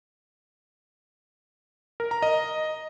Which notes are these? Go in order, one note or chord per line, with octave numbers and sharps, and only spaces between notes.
A#4
A#5
D#5